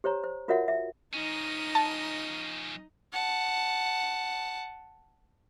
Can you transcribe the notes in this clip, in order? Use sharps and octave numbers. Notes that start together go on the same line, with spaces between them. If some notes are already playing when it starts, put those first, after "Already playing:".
G4 C5 C#5 A#5
C5
F4 F#4 A#4 C#5 E5 F#5
E5
F3 C#4 D#4 D#5 A#5
A5
F#5 A5